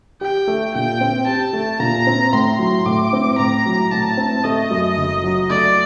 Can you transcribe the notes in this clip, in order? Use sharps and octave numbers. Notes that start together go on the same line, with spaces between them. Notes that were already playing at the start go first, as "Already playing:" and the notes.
G4 G5
A3
A#2 G5
C4
G4 A5
A3
A#2 A#5
C4
A2 C6
F#3
A2 D6
C4
A2 A#5
F#3
A2 A5
C4
A3 D#5
F#2
F#1
F#3
A3 D5